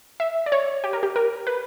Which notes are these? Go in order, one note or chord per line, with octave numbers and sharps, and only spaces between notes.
E5
D5
C#5
G4
A#4
G4
A#4
B4